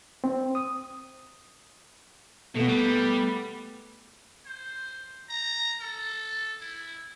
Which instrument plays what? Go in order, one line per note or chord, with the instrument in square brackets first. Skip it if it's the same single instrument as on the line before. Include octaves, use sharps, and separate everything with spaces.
[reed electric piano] C4
D#6
[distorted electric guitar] B2 [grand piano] A3 B3
[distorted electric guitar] G3
[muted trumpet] C5
A#5
A4
E4